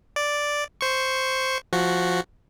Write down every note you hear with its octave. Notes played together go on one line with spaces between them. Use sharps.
D5
C5 C#6
F3 F#4